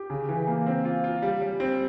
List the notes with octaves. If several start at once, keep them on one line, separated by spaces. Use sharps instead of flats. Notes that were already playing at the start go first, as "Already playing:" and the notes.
Already playing: G4
C#3
E3
A#3
C4
F4
F4
G3
G3
C4